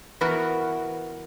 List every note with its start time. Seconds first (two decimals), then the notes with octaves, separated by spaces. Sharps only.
0.21 E3 B3 F#4 A#4